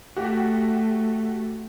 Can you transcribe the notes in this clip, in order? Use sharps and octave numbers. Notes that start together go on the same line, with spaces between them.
A3 F#4 G4